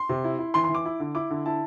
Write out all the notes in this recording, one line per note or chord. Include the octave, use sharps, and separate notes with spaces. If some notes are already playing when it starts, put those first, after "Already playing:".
Already playing: C6
C3
E4
E4
E3 C6
C6
E3
D6
E4
D3
E4 D6
D3
E4 A5